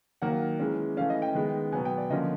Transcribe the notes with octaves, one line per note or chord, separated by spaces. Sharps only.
D#3 F#3 A#3 F#5
E3 G#3 C#4
E3 A3 C#4 F5
D#5
G5
D#3 G#3 B3
B2 F#3 B3 G#5
G5
D5
D3 F3 A#3 C#4 D#5